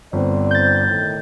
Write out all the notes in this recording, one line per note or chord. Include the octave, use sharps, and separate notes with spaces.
G1 C4 D5
G6 A6
A2 D#3